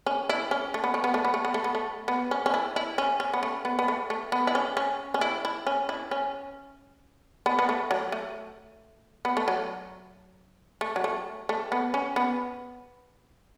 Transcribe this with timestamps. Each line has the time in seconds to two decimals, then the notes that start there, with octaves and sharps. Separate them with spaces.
0.06 C#4
0.29 E4
0.51 C#4
0.74 A3
0.84 B3
0.94 A3
1.04 B3
1.14 A3
1.24 B3
1.34 A3
1.45 B3
1.54 A3
1.64 B3
1.75 A3
2.08 B3
2.31 C#4
2.46 C#4
2.54 E4
2.76 E4
2.98 C#4
3.20 C#4
3.34 B3
3.43 A3
3.65 B3
3.79 B3
3.88 A3
4.10 A3
4.32 B3
4.47 E4
4.55 C#4
4.77 C#4
5.14 C#4
5.21 E4
5.45 E4
5.67 C#4
5.89 E4
6.11 C#4
7.46 B3
7.59 B3
7.69 A3
7.91 F#3
8.12 A3
9.25 B3
9.37 A3
9.48 F#3
10.81 A3
10.96 F#3
11.04 A3
11.49 A3
11.72 B3
11.94 C#4
12.16 B3